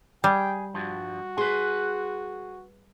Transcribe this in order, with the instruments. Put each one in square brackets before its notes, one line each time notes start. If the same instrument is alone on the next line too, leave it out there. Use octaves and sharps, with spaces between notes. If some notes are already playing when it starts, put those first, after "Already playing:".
[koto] G3 [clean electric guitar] G#4 [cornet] G5
[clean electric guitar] G2 F3 [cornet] F#4
[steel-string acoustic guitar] G#4 [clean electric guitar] B4 C6